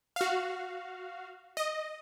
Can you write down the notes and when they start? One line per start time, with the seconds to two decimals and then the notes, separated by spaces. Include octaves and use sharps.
0.16 F#4 F5
1.57 D#5